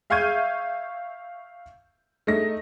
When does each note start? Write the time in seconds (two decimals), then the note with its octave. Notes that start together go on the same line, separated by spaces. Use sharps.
0.10 E5 F5 C#6 G6 G#6 D#7
2.27 A3 D#4 A#6